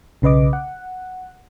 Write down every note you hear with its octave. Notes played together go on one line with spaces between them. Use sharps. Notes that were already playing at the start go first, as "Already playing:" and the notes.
B1 C#3 B4 D#5 D6
F#5